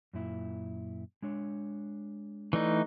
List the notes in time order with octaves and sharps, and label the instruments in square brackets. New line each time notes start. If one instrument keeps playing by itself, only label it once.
[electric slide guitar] F#2 A#2 E4
G#3 D4 C#5
[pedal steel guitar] E3 A3 D#4 [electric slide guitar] D5